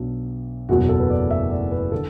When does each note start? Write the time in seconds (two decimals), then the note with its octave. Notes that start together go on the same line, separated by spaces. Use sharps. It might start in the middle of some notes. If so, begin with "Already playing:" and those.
Already playing: B1 B2 F#3 D4
0.69 F#1 E2 B2 F#3 F#4
0.89 A4
1.00 B4
1.10 D5
1.31 E5
1.51 D5
1.71 B4
1.92 D3 A4